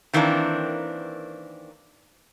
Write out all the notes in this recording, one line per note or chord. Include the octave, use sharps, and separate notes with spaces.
D#3 E3 A#3 C4 D4